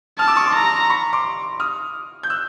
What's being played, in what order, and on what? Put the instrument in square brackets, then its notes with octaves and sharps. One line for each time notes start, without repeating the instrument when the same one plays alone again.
[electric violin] A5 [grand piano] D#6 F6
[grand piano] D6 E6
C#6 D#6
C6 D6
[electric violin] A#5
[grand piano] B5 C#6
C6 D6
D#6 F6
G6
E6 F#6